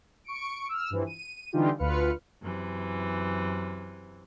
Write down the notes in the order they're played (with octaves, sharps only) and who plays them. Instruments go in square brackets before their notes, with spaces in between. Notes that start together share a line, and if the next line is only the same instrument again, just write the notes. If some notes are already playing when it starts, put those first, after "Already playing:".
[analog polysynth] C#6 C#7 D7
E6 F6
G2 E3 F3
D#7
D3 E3 G3 D#4 F4 G4
D2 F4 B4 F6 C#7
[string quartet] F#2 C3 E3